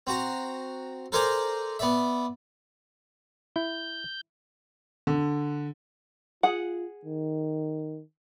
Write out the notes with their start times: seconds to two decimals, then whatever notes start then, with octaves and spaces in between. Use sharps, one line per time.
0.07 C4 F#4 A#5
1.12 A4 A#4 C5 D5 G#5 A#5
1.79 B3 D5 E5
3.56 E4 G6
5.07 D3
6.43 F4 G#4 F#5
7.05 D#3